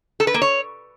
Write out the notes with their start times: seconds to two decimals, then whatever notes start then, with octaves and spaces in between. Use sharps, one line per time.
0.20 A4
0.27 B4
0.34 A#3
0.42 C#5